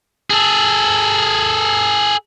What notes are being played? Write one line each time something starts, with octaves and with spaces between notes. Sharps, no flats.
G#4 A4